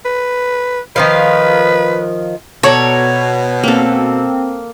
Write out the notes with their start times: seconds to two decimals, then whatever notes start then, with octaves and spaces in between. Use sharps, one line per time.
0.05 B4
0.96 D#3 F3 B4 F5
2.63 B2 A4 C#5 D5 A#5
3.63 A#3 C4 A4